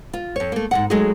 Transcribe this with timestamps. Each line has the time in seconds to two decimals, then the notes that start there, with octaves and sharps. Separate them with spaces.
0.13 F4
0.36 F2 C#5
0.52 A3 A#3
0.71 G#2 F3 F#5
0.90 F#3 G#3 A3 D#4 F#4 G#4